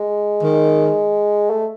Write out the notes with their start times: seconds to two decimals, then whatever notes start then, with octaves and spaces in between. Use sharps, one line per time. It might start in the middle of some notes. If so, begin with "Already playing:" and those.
Already playing: G#3
0.43 D#3
1.50 A3